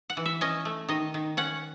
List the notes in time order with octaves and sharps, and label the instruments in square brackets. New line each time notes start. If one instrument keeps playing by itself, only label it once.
[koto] F#5
E3
E5
C#4 D#5
A3
D#3 D#5
D#3
C#4 F#5